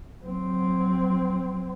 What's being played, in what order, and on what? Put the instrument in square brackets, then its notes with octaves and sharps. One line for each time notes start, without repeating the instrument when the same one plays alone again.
[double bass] F#3 C4